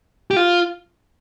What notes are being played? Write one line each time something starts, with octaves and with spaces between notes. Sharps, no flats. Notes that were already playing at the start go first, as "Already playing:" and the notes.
G4
F4